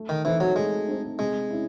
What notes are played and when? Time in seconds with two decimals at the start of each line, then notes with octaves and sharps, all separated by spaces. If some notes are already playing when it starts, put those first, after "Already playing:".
Already playing: A3
0.09 D#3
0.25 E3 C4 D#4 A4 C5
0.40 F#3
0.56 G#3 A3
0.88 C4 D#4 A4 C5
1.19 C3 G#3
1.50 C#4 E4